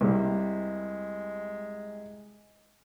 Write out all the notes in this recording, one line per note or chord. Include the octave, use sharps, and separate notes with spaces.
C2 G3 G#3